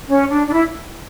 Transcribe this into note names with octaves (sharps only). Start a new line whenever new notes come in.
C#4
D4
D4
E4